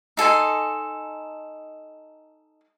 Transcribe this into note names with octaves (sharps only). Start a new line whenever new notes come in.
D#4 A4 G#5 C6